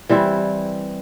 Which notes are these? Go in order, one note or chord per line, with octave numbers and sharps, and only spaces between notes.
E3 G3 C4 E4